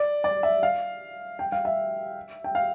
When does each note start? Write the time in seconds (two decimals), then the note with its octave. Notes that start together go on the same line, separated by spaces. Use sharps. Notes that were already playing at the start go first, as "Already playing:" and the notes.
Already playing: D5
0.24 D5
0.43 E5
0.63 F5
1.39 G5
1.52 F5
1.65 E5
2.44 G5
2.55 F5